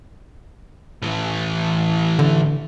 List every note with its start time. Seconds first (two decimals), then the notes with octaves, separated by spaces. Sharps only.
1.02 A2 E3
2.19 D3